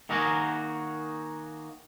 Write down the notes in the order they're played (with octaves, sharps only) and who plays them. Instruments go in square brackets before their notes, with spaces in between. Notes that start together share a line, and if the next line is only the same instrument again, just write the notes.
[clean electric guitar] D#3 A#3 D#4 F#4 G#4 A#4